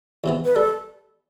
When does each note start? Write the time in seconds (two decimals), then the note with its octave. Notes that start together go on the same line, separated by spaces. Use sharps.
0.24 E2 C3 E3 B3
0.45 B4
0.55 G3 A4